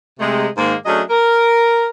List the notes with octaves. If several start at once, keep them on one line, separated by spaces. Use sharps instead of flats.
C3 G#3 A3
G#2 D#3 G#3 A#3
F#3 A3 C#4 D4 G#4 D#5
A#4